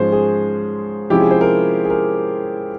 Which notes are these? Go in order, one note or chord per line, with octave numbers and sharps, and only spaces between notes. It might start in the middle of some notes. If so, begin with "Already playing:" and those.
Already playing: G#2 F3 G#3 C#4 C5
G#4
C3 F3 G#3 C#4 E4 G4
G#4
C5
A#4
G#4
A#4